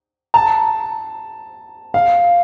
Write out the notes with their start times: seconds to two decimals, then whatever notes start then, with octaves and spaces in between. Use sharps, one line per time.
0.34 A5
1.94 F5